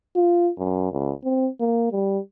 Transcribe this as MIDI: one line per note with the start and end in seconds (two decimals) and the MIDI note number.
0.16 0.50 65
0.58 0.90 42
0.92 1.12 37
1.24 1.49 60
1.60 1.92 58
1.92 2.19 55